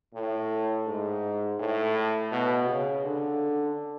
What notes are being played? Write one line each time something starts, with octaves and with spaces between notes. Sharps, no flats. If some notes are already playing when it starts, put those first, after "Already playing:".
A2
G#2
A2
B2
C#3
D3